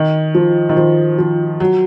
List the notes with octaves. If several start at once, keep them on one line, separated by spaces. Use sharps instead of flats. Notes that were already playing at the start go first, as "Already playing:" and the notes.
Already playing: D#3
F3
D#3
F3
F3
F#3